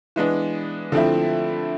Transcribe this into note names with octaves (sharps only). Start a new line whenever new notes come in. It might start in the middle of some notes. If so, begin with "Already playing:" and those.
E3 G#3 B3 D4
D3 F3 A3 C4 E4